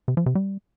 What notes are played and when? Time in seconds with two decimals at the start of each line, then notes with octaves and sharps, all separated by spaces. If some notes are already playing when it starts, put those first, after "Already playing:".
0.08 C3
0.17 F3
0.26 C3
0.35 G3